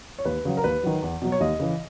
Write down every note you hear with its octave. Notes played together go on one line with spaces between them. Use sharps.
C#5
D#2 B4
C#3 F#3
A#4
D#2 B4
D#3 F#3
E2
B2 F#3
C#5
D#2 D#5
C#3 E3